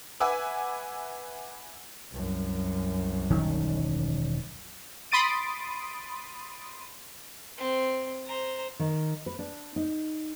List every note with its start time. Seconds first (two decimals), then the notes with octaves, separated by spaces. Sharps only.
0.20 B4 E5 F#5 G#5 D6 E6
2.12 C2 F#2
3.30 E1 D#3 C#4
5.12 B5 C6 D#6 A6 D7 D#7
7.57 C4
8.26 C5 A#5
8.79 D#3
9.26 B4
9.39 D4
9.76 D#4